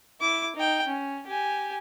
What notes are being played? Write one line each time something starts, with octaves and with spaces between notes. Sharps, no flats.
E4 D6
D#4 G5
C#4
G4 G#5